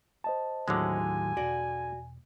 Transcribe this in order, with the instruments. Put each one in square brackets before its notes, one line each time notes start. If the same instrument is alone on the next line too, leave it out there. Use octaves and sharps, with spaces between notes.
[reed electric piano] C5 D#5 A5
[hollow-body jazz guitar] D#2 A2 F#3 [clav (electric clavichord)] D3 G#3 [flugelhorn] G#5
[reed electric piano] E2 B2 [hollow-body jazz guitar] F#4 D5